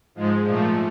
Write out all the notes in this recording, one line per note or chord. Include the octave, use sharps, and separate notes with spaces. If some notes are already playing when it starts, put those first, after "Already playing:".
G#2 F3 G#3
A#2 F3 A3